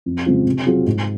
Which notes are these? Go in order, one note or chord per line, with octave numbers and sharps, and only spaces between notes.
F2
C#3 G#3 C4 F4
C3
F#3 C4 F4 G#4
G#2